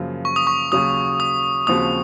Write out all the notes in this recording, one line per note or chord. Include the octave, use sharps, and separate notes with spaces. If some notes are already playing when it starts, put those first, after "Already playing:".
Already playing: F#2 C#3 F3 A#3
C#6
D#6
C#6
D#2 C#3 F#3 D#6
D#6
D#2 C#3 F3 C4 F#4 D#6